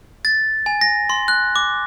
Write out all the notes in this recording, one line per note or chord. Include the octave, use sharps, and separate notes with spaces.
A6
G#5
A#6
C6
F#6
D6